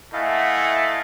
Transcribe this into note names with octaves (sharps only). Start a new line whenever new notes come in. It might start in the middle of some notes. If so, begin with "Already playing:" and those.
A3 E4 D#5 F5 F#5 G#5